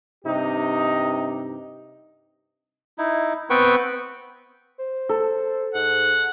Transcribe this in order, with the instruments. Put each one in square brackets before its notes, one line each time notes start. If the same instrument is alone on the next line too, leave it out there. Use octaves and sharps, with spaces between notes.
[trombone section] G2 C3 D#4 G4
[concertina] D#4 E4
B3 C4 B4 G5 C#6
[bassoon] C5
[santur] A4
[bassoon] G#2 [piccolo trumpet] F#5